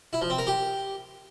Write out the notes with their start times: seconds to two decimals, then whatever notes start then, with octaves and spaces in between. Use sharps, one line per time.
0.13 E4
0.21 F3
0.30 C4
0.38 A#4
0.47 G4